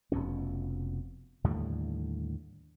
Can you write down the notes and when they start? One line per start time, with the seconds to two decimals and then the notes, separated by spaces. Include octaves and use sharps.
0.12 F1 F2 B2 C#4
1.44 D#2 A2 D3 G3